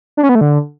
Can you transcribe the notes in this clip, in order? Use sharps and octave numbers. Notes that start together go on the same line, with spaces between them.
D4
C#4
B3
A3
D3